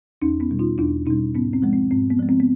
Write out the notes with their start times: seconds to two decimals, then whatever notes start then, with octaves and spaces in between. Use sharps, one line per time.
0.22 E2 C#4 D#4
0.40 B3 C#4
0.51 B2 G3
0.59 D#4 F4
0.78 E2 D4 E4
1.06 B2 G3 C#4 D#4
1.35 G#2 B3 C#4
1.53 C4
1.62 F3 G#3
1.73 C4
1.91 G#2 C4
2.10 B3
2.19 F3 G#3
2.29 C4
2.40 B3